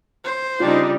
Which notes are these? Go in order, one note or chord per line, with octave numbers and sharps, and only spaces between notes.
C5
C#3 G3 D4 D#4 F4